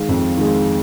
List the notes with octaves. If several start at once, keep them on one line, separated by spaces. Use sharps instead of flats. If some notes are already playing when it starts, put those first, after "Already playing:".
Already playing: D#3 G#3 F5
F2
D#3 G#3